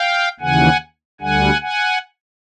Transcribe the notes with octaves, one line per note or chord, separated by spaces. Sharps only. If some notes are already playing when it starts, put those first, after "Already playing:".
Already playing: F5 G5
D#2 C#3 E3 F#5 G#5
D2 D3 G3 F#5 G#5
F#5 G#5